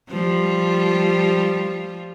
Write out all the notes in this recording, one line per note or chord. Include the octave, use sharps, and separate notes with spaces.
F3 G3 F4